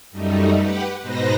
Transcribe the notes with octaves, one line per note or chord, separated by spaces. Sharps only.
F#2 G3 A3 D#4
G4 B4 F#5
G#2 B2 D#4 B4 C5 A#6